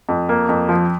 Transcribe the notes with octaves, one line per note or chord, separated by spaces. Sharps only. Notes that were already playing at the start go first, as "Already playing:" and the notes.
F2
A#3
F2
F3